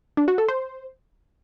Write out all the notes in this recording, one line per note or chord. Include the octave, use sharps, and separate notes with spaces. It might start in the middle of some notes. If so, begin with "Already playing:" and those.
D4
F#4
A4
C5